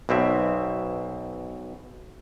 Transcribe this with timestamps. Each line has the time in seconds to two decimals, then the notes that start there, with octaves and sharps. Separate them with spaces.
0.09 B1 B2 C4 E5